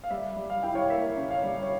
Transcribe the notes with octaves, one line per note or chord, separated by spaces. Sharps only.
F5
G3 E5
G3
F5
E4 G5
C#5 F5
A#3 E5
C#4
C#5 F5
G3
C#5